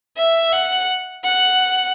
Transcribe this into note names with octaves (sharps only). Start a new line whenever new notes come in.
E5
F#5
F#5